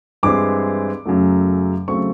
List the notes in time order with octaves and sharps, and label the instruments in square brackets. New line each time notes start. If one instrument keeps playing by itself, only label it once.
[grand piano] G2 E3 G#3 C4 D6
F#2 C#3 F#3 A3
C#3 F#3 A3 C4 C#6